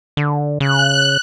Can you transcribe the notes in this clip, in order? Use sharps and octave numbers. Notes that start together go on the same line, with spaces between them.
D3
C#3 F#6